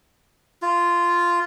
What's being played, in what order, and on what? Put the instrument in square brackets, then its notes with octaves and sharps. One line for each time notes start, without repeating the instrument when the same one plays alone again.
[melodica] F4